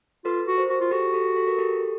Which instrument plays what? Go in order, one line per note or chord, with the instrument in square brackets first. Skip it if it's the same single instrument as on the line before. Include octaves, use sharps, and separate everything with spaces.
[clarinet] F4 [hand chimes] A4 B4
[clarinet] F#4
[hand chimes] A#4 C5
[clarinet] F#4
F4
[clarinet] F#4 [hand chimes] G4 A4
[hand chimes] G4 A4
A4
A#4
G4 A4